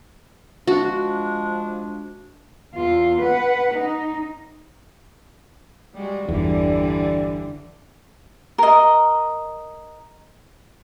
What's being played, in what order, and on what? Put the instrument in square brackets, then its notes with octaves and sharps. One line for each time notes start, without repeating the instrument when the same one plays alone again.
[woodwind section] F3 G#3 D4 [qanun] F#4
[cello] E2 F4
B4 F#5
D#4
[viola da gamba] G3 G#3 F#4
[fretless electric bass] G1 E2 [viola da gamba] D3 E3 G3
[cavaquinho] A#4 D#5